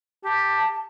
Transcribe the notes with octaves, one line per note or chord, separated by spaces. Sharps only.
G4 A5